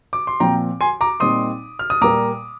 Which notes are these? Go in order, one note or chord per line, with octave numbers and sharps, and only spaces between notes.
D6
C6
A#2 F3 C4 G5 A#5
G#5 C6
A#5 D6
A#2 G3 C4 D#4 C6 D#6
F6
D#6
A#2 G3 A#3 A#5 D6